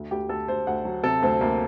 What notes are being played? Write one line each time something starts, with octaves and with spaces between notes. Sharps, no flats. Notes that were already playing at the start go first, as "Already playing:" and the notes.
Already playing: D2
D2 G4
D2 A4
D2 C5
D2 F#5
F#3
C3 A4
D2 C4
D2 A#3